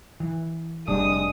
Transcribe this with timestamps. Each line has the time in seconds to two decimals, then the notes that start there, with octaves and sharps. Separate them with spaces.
0.20 E3
0.88 F1 C3 G3 G#3 D4 D#6